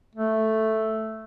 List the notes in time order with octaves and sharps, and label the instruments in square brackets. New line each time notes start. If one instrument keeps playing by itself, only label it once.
[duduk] A3